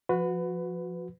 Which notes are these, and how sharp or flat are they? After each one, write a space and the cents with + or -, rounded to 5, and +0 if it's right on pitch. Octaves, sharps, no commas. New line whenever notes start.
F3 +0 F#4 -20 B4 +20